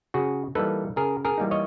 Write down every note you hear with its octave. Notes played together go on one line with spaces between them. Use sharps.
C#3 F#4 G#4
E3 G3 A#3 D#4 A4 B4
C#3 G#4 A#4
G#4 A#4
E3 G3 A#3 D#4
C#5 D#5